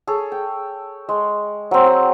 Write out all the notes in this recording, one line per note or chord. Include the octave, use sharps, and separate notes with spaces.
G#4 A4 C#5
G5
G#3
F#3 C4
F#5